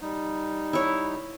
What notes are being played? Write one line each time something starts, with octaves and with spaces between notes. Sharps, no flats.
G3 D#4
E4 C#5